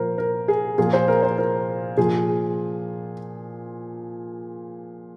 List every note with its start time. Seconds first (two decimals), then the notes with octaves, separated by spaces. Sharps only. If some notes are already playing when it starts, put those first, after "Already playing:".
Already playing: A#2 F3 A#4 C5
0.18 A#4
0.48 G#4
0.78 A#2 F3 G#4
0.93 C5
1.08 A#4
1.23 C5
1.38 A#4
1.97 A#2 F3 G#4